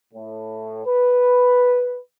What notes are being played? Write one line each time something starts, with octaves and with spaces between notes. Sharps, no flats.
A2
B4